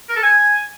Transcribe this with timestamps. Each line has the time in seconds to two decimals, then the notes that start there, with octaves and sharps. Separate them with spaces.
0.09 A#4
0.16 A4
0.23 G#5